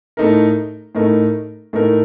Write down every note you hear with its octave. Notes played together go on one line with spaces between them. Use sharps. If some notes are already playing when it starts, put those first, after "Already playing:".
A2 A3 D#4 A#4
A2 A3 D#4 A#4
A2 A3 D#4 A#4